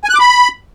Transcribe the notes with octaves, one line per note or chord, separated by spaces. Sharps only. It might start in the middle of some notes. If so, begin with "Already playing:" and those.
G#5
F#6
D6
B5